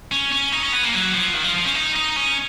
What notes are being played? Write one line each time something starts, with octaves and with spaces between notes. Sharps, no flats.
C#4
C#4
D#4
C#4
B3
A#3
F#3
F3
D#3
F3
F3
C#4
D#4
D#4
C#4